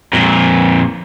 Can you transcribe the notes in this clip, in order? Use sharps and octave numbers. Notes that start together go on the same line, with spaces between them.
F2 A#2